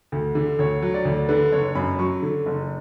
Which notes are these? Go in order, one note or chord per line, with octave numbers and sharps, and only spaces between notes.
D2
D3
D2 C#5
F#3
D5
D2
D3 B4
F#1 C#5
F#2 B5
F#3 C#6
D3
F#1